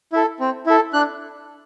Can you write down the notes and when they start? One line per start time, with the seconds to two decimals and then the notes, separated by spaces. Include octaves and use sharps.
0.13 E4 A4
0.40 C4
0.66 E4 A4
0.93 D4 F#6